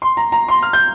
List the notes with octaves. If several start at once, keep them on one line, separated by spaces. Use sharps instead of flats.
C6
A#5
A#5
C6
F6
G6